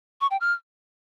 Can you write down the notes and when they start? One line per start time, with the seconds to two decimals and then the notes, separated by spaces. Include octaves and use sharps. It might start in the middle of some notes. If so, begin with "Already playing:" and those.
0.21 C#6
0.31 G5
0.41 F6